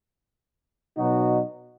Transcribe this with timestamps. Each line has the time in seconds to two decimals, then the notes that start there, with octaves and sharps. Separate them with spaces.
0.97 B2 F#3 D#4 F#4